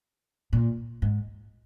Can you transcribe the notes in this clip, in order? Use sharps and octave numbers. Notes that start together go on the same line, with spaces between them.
A#2
G#2